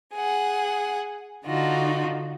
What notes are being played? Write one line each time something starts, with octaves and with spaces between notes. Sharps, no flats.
G#4 F#5
D3 D#4 F4 F#4